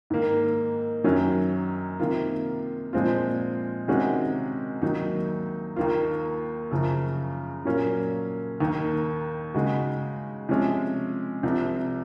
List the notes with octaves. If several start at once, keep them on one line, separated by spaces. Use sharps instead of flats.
G#2 D#3 A#3
F#2 D#3 F#3 C#4
C3 D#3 A#3 F4
A#2 F3 G#3 C4 F4
C3 D#3 G#3 C#4 F#4
D#2 D#3 F#3 A#3 D#4
D#2 D#3 A#3 F4
F#2 C#3 F3
A#2 F#3 A#3 C#4 F4
D#2 D#3 A#3
C#3 G#3 D#4 F#4
C3 F3 G#3 C#4
C2 C3 F3